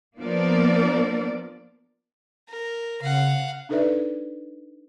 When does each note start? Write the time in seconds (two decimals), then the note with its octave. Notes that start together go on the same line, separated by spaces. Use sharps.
0.18 F3 A#3 B3 D4 A#4 D5
2.49 A#4
3.01 C#3 F5 F#5
3.69 D4 D#4 A4 B4 D5 E5